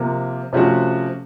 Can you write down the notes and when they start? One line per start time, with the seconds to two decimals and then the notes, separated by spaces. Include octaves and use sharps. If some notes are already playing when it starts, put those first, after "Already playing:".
Already playing: C3 F3 A#3
0.53 C3 F3 A3 C#4 F#4